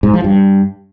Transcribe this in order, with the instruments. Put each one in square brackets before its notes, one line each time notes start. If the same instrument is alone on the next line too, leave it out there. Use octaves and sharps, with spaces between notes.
[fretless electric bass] G#2
F3
G2